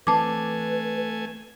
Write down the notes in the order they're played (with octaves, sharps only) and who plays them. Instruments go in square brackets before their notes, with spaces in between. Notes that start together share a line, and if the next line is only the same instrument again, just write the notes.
[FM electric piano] E3 C4 [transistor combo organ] A3 G#5 [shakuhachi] B4 [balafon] A5 D6